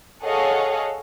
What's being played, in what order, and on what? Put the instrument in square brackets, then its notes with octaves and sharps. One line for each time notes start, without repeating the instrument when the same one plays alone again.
[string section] G#4 A4 C#5 D#5 F5 F#5